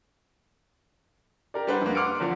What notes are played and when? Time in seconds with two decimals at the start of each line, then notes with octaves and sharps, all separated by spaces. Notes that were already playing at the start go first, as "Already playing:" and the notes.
1.54 G4 A#4 D5
1.67 G3 D4 B4 C5 F#5
1.82 F2 A#3
1.95 F#5 C6 D6 F6 C#7 D7
2.20 E2 D3 F3